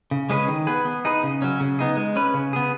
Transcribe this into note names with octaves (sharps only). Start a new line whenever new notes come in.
C#3
G#3 C#4 G#4 B4
D#3
B3 G#4 B4
B3
D#4 G#4 B4
C#3
F#3 C#4
C#3
B3 D#4 G#4
G#3
C#4 B4
C#3
B3 G#4